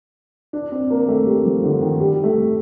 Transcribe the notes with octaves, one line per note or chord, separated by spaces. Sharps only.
D4
C4
A#3
A3
G3
F3
D3
D#3
G3
A3